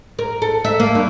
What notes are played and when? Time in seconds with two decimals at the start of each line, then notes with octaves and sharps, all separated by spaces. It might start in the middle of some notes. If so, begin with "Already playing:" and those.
0.19 A#4
0.42 A4
0.65 E5
0.80 A#3
0.95 G2